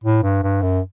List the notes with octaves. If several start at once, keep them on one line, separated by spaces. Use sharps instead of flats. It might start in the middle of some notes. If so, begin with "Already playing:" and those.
A2
G2
G2
F#2